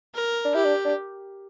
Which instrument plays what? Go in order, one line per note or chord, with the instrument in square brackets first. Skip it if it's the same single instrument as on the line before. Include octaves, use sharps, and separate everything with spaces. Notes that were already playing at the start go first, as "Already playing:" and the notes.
[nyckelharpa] A#4
[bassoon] D4
[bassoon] E4 [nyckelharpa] G4
[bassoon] D4
D4